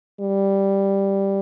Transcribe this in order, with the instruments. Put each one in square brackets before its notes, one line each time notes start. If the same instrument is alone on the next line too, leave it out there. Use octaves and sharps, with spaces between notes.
[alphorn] G3